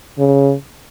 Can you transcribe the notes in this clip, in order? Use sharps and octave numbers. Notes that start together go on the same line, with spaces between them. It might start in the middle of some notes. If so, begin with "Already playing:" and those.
C#3